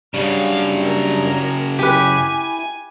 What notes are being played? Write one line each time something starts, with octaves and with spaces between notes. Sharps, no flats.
F#2 C#3 G3 D4 F5
A#4
E4 G4 B4 G#5